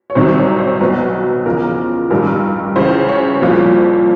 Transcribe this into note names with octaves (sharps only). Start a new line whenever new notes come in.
C#5
C2 C3 D#3 F#3 C5
C#5
C5
B1 B2 F#3 B4
E2 C#3 F3 A#4
A1 G2 D#3 G3 A#4
C#2 C#3 E3 C5
C#5
C2 A#2 F3